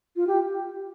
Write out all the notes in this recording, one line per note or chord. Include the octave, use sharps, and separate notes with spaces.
F4
G4